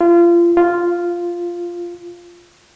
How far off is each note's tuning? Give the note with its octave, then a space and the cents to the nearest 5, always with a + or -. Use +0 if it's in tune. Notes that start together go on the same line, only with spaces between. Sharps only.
F4 -30
F4 -5